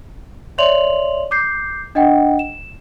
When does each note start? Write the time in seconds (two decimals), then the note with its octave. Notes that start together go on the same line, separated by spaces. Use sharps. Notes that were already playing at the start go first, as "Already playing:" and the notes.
0.58 C#5 D5 E5 C6 F7 F#7
1.31 D6 G6 C7
1.95 D4 D#5 F#5 G5
2.39 E7